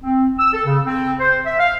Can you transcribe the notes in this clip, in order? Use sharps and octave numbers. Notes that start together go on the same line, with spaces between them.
C4
E6
A4
C#3
C4
C5
E5
F5